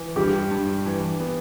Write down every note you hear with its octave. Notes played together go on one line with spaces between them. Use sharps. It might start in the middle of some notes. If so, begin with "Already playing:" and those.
Already playing: E3
G2 G4
G2
E3
B3